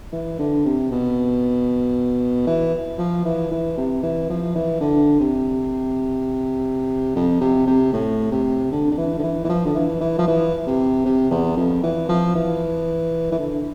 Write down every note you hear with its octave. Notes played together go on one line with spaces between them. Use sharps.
E3
D3
C3
B2
E3
F3
E3
E3
C3
E3
F3
E3
D3
C3
F2
C3
C3
A2
C3
D3
D3
E3
D3
E3
E3
F3
D3
E3
E3
F3
E3
C3
C3
E2
F2
E3
F3
E3
E3
D3